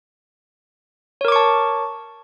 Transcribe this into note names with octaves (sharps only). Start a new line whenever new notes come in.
A#4 C#5 A5 C#6 D6